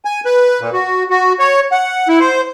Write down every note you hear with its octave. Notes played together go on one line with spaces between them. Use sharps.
G#5
B4
A#2
F#4
F#4
C#5
F#5
E4
C5